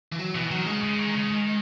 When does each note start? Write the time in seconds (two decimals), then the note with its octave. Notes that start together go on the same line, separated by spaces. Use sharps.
0.12 E3
0.19 F#3
0.35 B2 E3
0.51 D#3 F#3
0.66 C#3 G#3
0.83 C#3
0.98 D#3
1.09 D#3
1.15 C#3
1.30 D#3